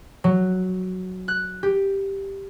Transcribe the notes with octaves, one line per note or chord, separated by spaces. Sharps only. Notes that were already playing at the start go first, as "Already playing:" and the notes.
F#3
F#6
G4